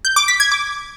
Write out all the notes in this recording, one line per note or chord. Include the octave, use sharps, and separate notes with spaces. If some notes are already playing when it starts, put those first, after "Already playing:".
G6
D6
B6
G#6
D6